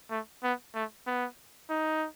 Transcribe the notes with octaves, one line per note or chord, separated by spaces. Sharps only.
A3
B3
A3
B3
D#4